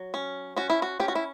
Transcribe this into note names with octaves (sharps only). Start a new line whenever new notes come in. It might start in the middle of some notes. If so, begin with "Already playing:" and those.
Already playing: F#3
C#4
C#4 F#4
E4
F#4
C#4 G4
F#4
E4